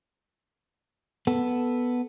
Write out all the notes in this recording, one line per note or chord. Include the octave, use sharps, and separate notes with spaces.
B3 A4